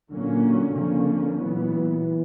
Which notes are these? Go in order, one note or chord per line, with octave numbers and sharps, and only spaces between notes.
A#2 D3 F#3 A#3 C#4
F2 C#3 F3 A#3 C#4
A#2 E3 F#3 B3